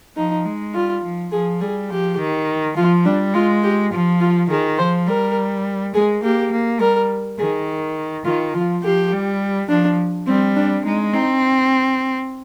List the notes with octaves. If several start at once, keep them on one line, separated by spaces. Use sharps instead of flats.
F3 D#4
G#3
G3 F4
F3
F3 G#4
G3 G#4
F3 G4
D#3
F3 F4
G3 D4
G#3 F4
G4
F3 F4
F4
D#3 G#4
F3 C5
G3 A#4
G#3 G#4
A#3 G4
A#3
G3 A#4
D#3 G#4
D#3 F4
F3 F4
F3 G4
G3
F3 D4
G3 C4
D4
G#3 D#4
C4 D#4